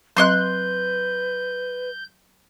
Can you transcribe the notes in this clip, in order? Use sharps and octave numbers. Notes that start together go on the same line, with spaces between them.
F#3 C4 B4 D#5 C6 C#6 F#6 G6